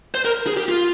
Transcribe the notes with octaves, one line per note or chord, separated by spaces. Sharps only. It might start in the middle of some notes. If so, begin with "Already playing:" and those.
C5
A#4
G#4
G4
F4